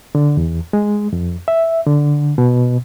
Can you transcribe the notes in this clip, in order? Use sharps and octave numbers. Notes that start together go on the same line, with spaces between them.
D3
E2
G#3
F2
E5
D3
B2